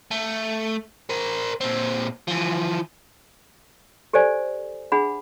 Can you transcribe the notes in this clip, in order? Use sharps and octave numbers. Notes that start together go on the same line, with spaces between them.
A3
A#4 C5
A#2 C4
E3 F3
G4 A4 C5 D5 G#5
D4 G#4 F#5 B5